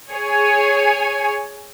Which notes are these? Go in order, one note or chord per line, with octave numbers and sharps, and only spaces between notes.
G#4 C#5 G#5